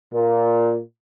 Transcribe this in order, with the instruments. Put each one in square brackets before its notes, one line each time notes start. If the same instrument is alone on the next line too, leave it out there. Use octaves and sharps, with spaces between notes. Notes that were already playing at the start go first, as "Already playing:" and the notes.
[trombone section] A#2